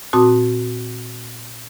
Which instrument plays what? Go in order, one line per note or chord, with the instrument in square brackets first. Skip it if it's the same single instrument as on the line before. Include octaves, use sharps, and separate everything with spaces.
[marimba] A#2 C4 F#4 A5 D#6